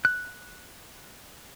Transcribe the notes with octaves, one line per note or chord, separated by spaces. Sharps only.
F#6